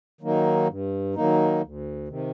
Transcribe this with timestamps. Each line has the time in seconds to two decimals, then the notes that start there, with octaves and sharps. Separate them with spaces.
0.21 D#3 F#3 A#3 D#4
0.68 G2
1.15 D#3 F#3 A#3 D#4
1.62 D2
2.08 C3 D#3